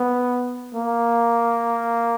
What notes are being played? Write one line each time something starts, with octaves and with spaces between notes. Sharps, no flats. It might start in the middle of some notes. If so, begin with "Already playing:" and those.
Already playing: B3
A#3